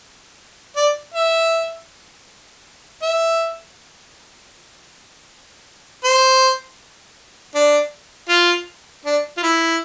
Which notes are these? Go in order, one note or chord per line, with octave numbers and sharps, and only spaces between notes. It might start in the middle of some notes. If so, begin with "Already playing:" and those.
D5
E5
E5
C5
D4
F4
D4
F4
E4